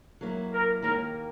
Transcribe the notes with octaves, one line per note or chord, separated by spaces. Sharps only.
F#3 A#3 E4
A#4
D#2 D#3 A#3 A#4